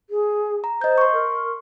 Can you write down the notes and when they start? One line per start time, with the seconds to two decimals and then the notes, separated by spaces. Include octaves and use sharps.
0.10 G#4
0.64 A#5
0.81 C5 D#5 G6
0.98 C6 C#6
1.13 A#4